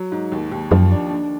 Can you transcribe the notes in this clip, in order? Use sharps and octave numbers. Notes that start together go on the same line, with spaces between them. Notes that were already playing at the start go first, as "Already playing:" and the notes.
Already playing: F#3
G#2
D#2
D#2
F#2 F3
D4
D3